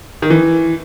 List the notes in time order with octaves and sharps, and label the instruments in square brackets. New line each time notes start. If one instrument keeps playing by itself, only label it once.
[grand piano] D#3
E3